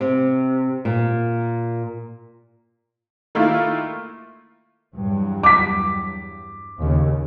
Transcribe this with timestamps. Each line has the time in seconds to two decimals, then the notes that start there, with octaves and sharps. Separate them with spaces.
0.01 C3
0.85 A#2
3.35 D#3 A3 A#3 E4 F4
4.94 E2 G2 F#3
5.43 D6 B6
6.78 D#2 C#3